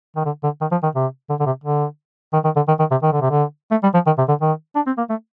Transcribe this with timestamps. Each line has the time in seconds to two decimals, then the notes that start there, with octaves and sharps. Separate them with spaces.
0.16 D#3
0.25 D3
0.43 D3
0.61 D#3
0.71 F3
0.83 D#3
0.96 C3
1.29 D3
1.40 D3
1.46 C3
1.64 D3
2.33 D#3
2.44 D#3
2.56 D3
2.68 D#3
2.79 D#3
2.91 C3
3.03 D#3
3.12 D3
3.21 C3
3.31 D3
3.71 A3
3.83 G3
3.94 F3
4.06 D#3
4.18 C3
4.28 D3
4.41 D#3
4.75 D4
4.86 C4
4.98 A#3
5.09 A3